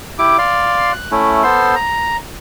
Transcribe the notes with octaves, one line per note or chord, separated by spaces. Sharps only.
E4 G4 D6
D5 F5 C6
F#6
A3 C#4 E4
B3 A4 C5 C6
A#5